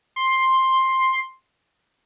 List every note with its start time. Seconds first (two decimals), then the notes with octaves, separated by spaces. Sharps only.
0.16 C6